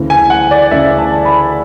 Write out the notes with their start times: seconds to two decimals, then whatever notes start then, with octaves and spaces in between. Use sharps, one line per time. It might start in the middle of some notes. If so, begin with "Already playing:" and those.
Already playing: D2 C#3 E3
0.10 G#5
0.30 F#5
0.51 D5
0.71 D2 C#3 E3 E5
0.99 A5
1.25 B5